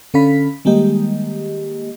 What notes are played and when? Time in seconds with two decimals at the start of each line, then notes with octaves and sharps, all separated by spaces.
0.14 D3 C#4 A4 F5 B5 B6
0.65 D#3 G3 G#3 A#3 G4 D#5